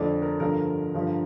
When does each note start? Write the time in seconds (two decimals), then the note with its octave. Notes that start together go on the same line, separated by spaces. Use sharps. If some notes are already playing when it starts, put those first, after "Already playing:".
Already playing: F2 D3 A3 D5
0.22 A#4
0.40 G2 D3 F3 A3 A#4
0.94 G2 D3 F3